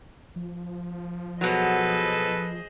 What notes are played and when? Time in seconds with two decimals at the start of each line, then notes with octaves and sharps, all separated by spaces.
0.36 F3
1.41 B2 F#3 G#4 A4 B4 C5 D#5